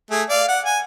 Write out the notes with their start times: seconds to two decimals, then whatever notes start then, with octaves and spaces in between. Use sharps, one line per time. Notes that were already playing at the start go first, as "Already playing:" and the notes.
0.11 A3 G#4
0.30 D5 F5
0.48 F#5
0.65 G#5